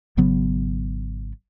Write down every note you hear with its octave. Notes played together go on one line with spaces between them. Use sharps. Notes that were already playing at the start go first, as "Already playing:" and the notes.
G#1 C#3 F#3 B3